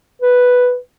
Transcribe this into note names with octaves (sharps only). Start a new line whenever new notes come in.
B4